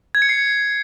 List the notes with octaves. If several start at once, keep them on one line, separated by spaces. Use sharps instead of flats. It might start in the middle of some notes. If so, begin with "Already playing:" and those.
G#6
C#7
C7